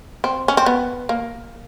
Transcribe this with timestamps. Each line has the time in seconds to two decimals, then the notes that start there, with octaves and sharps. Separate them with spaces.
0.24 C4
0.48 C#4
0.57 C4
0.66 B3
1.09 A#3